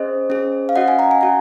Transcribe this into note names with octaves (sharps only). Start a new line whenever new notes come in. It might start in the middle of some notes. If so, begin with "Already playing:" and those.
Already playing: C#4 G#4 C5 D#5
C#4 G#4
F5
C#4 F#4 D#5 F#5
F5 G#5
F#5 A#5
G#5
C#4 F#4 A#5